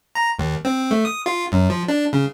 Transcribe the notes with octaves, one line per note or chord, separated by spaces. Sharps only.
A#5
D#2
C4
A3
D#6
F4
F#2
F3
D4
C#3